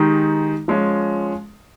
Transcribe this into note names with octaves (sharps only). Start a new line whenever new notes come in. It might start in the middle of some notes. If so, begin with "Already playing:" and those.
Already playing: D#3 G#3 D#4 G4
F3 G#3 C#4 F4